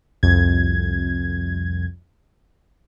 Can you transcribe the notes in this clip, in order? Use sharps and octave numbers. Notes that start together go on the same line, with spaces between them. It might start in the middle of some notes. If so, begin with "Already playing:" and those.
C2 F2 G#6